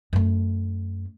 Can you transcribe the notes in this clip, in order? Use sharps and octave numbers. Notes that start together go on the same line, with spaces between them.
F#2 A3